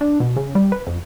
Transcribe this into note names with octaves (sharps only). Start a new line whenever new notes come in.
D4
B2
C#3
G3
B4
F2